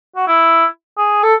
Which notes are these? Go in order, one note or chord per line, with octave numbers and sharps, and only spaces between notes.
F#4
E4
G#4
A4